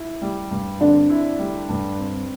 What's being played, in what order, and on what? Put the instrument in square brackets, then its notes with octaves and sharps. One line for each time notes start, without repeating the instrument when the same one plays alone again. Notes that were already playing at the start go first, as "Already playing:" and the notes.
Already playing: [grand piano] E4
G3
G2
[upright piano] D3 D4 [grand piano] C4
[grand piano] E4
G3
G2
C4